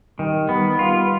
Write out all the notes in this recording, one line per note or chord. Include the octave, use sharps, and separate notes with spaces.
D#3 G3
G3 B3
F4